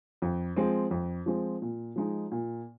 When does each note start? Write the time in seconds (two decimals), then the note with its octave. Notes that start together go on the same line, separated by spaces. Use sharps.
0.22 F2
0.56 F3 G#3 C4
0.91 F2
1.26 F3 G#3 C4
1.62 A#2
1.96 F3 G#3 D#4
2.32 A#2